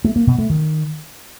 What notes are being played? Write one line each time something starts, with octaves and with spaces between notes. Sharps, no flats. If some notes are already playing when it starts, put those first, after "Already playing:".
A3
A#3
B2
A3
D#3